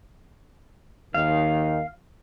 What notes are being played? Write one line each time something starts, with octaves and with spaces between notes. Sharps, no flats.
D#2 D#3 F5